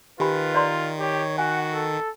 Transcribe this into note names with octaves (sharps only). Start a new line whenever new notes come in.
D#3 F4 G4 B4 G#5 B5
D5 A#5 C6
G4 C#5
F#4 F#5 G#5
A4